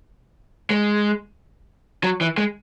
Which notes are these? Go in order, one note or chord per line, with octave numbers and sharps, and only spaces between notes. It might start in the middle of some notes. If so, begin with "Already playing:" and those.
G#3
F#3
E3
G#3